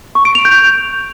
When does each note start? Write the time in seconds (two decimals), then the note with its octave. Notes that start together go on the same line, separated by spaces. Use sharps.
0.15 C#6
0.25 D7
0.35 F7
0.45 G6